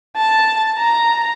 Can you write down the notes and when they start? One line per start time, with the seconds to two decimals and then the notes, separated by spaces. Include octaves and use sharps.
0.17 A5
0.78 A#5